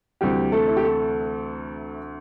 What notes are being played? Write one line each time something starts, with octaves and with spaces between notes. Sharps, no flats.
D2 C3 E3 G3 G4
A3 A4
E4
G4
A3 A4